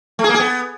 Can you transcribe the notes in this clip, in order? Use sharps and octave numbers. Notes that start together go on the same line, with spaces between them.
A3
G#4
A#3
G#4
B3